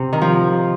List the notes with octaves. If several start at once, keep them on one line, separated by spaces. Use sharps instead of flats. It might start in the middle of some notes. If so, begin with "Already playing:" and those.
Already playing: C3
D#3
F3